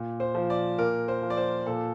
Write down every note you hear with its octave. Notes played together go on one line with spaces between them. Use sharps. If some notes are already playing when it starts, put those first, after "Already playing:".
Already playing: A#2
C5
F3
D5
A#2 A#4
C5
F3
D5
C5
A#2 A4